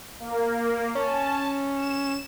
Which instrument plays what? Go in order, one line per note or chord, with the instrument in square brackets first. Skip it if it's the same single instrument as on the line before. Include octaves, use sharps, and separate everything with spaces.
[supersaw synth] A#3
[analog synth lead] C#4 [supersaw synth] A5
[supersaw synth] E7